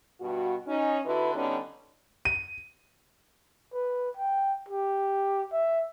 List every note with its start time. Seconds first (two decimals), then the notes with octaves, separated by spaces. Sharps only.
0.19 G2 B2 F#4
0.67 C#4 D#4
1.05 D3 E4 F#4 B4
1.35 D3 G3 B3 C#4 D#4
2.25 D#7
3.74 B4
4.17 G5
4.69 G4
5.53 E5